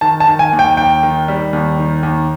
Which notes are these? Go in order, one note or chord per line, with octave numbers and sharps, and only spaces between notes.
D#3 A5
A5
D#3
G#5
D#2
G5
D#2 G5
D#3
G3
D#2
D#3
D#2